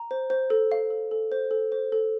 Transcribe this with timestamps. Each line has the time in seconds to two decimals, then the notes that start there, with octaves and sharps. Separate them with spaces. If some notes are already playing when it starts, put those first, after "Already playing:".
Already playing: A#5
0.11 C5
0.30 C5
0.50 A4
0.72 F5
0.90 A4
1.11 A4
1.32 C5
1.51 A4
1.72 C5
1.92 A4